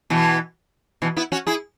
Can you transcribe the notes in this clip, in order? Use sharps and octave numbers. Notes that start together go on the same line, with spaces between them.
B2 E3
B2 E3
B3 E4
C#4 F#4
E4 G#4